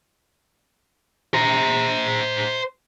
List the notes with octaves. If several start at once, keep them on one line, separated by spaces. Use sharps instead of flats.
C5 A#5